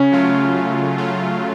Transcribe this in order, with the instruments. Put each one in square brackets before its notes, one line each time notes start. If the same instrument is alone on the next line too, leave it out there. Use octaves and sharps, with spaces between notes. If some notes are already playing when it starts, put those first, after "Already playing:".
Already playing: [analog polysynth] C#3 [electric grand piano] C#4
[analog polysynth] F#3 A3 F4
C#3
F#3 A3 F4